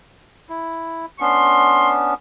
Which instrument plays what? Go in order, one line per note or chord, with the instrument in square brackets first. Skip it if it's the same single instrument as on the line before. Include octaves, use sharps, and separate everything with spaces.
[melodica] E4
[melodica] B3 C#4 D4 [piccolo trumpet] C6